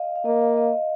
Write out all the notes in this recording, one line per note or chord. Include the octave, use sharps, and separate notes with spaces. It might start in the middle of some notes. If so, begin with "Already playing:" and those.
Already playing: D#5 F5
F5
A#3 D#5
F5
D#5